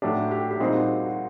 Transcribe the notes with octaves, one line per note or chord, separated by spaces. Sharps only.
A2 F#3 A3 D4 G4
G4
G4
A#2 G3 C4 D#4 G#4
F#4
F#4